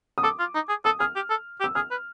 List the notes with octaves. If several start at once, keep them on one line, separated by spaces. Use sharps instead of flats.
D#6
A4 D6
F4
D#4
G#4
A4 D#6
G#4 F6
G4
A4
G4
E6
G#4 F6
B4